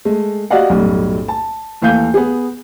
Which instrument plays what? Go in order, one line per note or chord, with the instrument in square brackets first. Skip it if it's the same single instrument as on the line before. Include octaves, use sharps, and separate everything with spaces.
[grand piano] G#3 A3
F#4 G4 D5 D#5 F5 F#5
B1 F#2 A2 G3
A5
D#2 E3 A3 F5 G6
B3 G#4